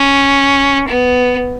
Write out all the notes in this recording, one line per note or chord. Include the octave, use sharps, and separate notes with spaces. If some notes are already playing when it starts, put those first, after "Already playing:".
Already playing: C#4
B3